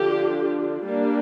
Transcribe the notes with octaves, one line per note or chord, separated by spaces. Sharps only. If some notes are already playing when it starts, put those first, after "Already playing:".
Already playing: D3 F3 D4 G4
G3 A#3 D4